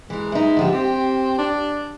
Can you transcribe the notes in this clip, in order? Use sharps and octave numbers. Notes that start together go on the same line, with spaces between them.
E3 G#3 A#4
D#4 E4
D3 F3 G4
C4 G4
D4